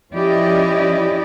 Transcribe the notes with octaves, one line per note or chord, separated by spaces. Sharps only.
F3 C#4 E4 G4 D5 D#5